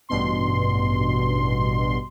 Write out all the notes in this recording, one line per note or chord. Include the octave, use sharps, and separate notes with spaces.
A1 G2 B2 C6